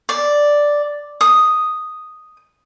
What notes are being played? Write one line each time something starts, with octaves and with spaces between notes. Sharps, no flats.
D5
D#6